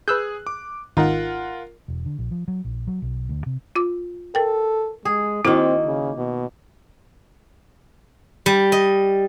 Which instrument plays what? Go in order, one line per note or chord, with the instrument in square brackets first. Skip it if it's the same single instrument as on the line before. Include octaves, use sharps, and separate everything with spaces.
[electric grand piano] G#4 F#6 [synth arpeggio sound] B4 E6 G6
[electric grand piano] D6
[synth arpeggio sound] G#1 D#4 [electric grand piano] F4 A#4 F#5
[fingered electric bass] E1
D3
A#1
F3
F#3
A#1
F#3
B1
D2
C3
[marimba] F4 D6
[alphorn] A4 [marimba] A#4 G5
[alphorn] G#3 [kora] G#4
[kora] D#3 A#3 [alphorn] C4 [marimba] E4 F#4
[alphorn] C#3
B2
[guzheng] G3
D#5